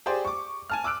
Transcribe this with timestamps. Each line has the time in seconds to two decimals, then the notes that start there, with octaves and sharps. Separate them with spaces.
0.06 G4 G#4 C5 D5 C6
0.25 C#6 D6
0.70 G#5 A5 F6
0.84 D6 E6 F#6 D7